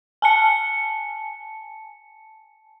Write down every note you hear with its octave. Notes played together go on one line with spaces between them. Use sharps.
G#5 A5 C#7